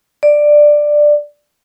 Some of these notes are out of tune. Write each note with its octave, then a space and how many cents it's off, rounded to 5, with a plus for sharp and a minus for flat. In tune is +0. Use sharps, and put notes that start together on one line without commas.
D5 +10